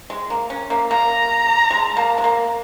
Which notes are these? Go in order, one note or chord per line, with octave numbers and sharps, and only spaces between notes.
G#3
A#3
C#4
A#3
A#3 A#5
G#3
A#3
G#3
A#3